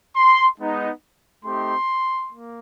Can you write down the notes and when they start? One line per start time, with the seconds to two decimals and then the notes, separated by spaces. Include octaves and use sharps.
0.16 C6
0.60 G#3 B3 D#4
1.44 A3 C4 D#4 G4 C6
2.31 A#3